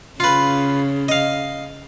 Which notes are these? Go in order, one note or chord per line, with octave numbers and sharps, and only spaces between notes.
C#3 F4 B4
D#5 F5